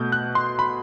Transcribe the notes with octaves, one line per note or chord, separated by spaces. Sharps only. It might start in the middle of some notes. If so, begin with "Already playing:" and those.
Already playing: B2 A3 G6
F#6
C6
B5